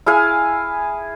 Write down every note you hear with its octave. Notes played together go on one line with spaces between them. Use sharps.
E4 G#4 F5 G#5